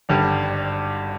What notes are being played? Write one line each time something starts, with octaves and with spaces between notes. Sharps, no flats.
G#1 G2 D3 G3